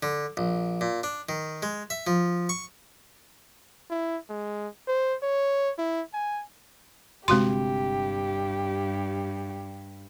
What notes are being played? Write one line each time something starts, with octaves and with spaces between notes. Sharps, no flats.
D3
A#1
A#2
D4
D#3
G#3
E5
F3
C#6
E4
G#3
C5
C#5
E4
G#5
G1 G2 C3 G#3 F#4 G4 C6